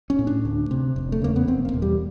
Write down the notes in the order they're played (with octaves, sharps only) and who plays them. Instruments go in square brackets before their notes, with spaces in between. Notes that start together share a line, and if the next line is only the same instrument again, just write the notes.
[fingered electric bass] C#4
A2
D4
D2
C3
F1
A3
E2 C#3 A#3
B3
F1 C4
A#3
E2 B2
G3